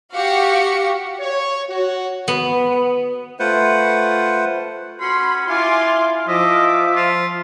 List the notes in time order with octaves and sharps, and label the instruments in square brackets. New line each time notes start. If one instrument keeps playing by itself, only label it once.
[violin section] F#4 G4 F5 C#7
[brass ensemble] C#5
F#4
[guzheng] B3
[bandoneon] A3 F4 B4 C5 F#5
[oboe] C#4 [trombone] F#4 [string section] B5 [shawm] C6
[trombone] E4 [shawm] F4 [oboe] F5 [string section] G#5 C6 D6
[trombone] F3 [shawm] D#5 [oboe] E5 [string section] D6
[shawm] F4